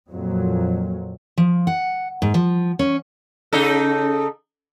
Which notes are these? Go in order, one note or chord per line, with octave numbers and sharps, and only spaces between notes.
F2 A#2 F#3
F3
F#5
G#2
F3
C#4
C#3 D#4 A4